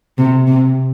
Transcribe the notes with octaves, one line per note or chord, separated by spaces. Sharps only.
C3
C3